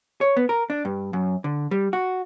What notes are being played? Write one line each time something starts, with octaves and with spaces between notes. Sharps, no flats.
C#5
B3
A#4
D4
G2
F#2
D3
G3
F#4